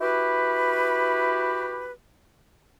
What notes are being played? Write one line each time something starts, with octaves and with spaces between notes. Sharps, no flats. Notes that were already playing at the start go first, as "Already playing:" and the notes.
E4 F#4 G4 B4